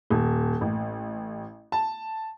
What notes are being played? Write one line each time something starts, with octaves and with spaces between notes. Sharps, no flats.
D#1
A1
A5